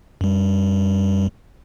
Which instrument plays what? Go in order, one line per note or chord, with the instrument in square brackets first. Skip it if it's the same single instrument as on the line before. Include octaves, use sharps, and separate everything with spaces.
[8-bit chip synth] F#2 G3